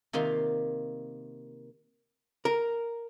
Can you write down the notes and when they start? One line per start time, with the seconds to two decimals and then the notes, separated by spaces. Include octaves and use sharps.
0.13 C3 D#3 A#3 F4 C6
2.45 A#4